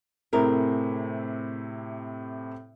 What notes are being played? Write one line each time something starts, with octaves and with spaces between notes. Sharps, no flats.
A2 C3 C4 E4 G#4 A#4